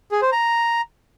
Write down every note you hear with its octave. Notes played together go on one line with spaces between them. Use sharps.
G#4
C5
A#5